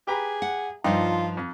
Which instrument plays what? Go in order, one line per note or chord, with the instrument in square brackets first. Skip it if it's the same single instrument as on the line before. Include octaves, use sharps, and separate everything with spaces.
[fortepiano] G4 B4 A#5 [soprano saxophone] G#4
[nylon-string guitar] F#5
[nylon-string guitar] G2 F3 [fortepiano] D4 D#4 G5 [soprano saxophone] F4
[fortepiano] F2